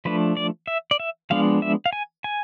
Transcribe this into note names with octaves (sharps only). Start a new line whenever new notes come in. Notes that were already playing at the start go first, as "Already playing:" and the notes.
F3 A3 D4 B4
D5
E5
D5
E5
F3 G#3 B3 D4 F5
E5
F5
G#5
G#5